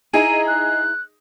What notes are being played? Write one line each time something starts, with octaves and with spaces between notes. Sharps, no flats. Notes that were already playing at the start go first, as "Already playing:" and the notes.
D#4 E4 G#4 G#5 A#5 D#7
F#6